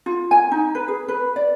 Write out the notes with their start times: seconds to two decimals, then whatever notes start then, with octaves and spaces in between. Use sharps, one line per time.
0.06 F4
0.31 G#5
0.51 D#4
0.75 B4
0.88 G#4
1.08 B4
1.36 D5